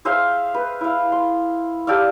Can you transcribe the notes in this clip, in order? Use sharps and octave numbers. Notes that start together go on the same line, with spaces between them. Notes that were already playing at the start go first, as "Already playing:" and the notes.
G#4 C5 E5 F5
B4
E4 F5
C6
G4 A4 D5 F5